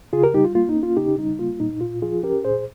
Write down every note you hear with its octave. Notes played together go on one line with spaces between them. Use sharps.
C#3 F4 G#4
G4 A#4
G3 D#4 G4
F4
A#3 F4
D#4
C#4
F4
C#3 D#4 G4
G3 D#4
A#3 F4
A#2 D#4
A#2 F4
F3 F4 G#4
C#4 G4 A#4
A#2 G#4 C5